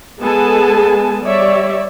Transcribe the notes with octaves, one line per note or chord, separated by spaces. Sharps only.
G#3 B3 G#4 A4 G#5 A5
G3 C#5 D5 E5